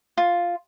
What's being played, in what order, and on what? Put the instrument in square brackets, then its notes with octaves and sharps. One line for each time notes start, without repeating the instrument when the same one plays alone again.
[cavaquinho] F4